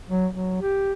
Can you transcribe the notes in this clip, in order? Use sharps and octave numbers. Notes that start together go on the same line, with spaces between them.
F#3
F#3
G4